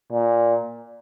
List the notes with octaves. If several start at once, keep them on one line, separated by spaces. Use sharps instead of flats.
A#2